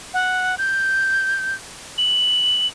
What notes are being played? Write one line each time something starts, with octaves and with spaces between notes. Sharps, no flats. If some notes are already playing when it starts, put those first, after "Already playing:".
F#5
G6
F#7